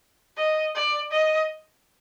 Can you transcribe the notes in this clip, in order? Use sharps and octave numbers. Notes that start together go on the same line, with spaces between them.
D#5
D5
D#5